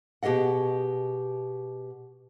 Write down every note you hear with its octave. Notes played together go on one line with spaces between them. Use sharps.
B2 G4 G#4 D#5 F#5